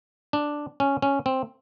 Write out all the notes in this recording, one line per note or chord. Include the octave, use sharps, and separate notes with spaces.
D4
C#4
C#4
C4